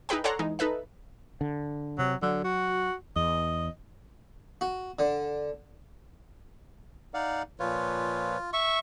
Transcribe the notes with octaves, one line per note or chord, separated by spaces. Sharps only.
D#4 E4 G#4 B4 G5
A4 C#5 D5 F#5 A#5 C6
E3 G#3 D#4
D#4 A4 B4 E5
D3
C3 F#3
D3 F#3
F#4
E2 D#5
F#4
D3
D#4 D5 F5 F#5
A#2 F3 F4 B4 C#5
E5 C#6